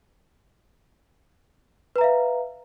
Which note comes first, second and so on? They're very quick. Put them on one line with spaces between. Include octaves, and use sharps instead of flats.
B4 A#5 E5 F5